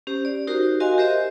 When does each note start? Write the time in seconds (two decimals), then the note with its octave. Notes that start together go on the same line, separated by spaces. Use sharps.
0.07 C#4 G4 C5
0.25 D5
0.47 D#4 F#4 G4 A#4 C5
0.80 F#4 A#4 D#5 F5 G#5 C6
0.98 G4 A#4 C5 D#5 E5